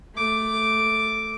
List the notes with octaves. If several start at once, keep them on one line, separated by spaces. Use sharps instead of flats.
A3 D6